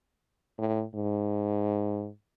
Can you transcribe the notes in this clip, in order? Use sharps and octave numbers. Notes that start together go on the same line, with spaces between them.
A2
G#2